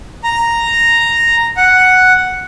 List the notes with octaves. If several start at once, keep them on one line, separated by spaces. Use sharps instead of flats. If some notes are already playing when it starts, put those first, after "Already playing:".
A#5
F#5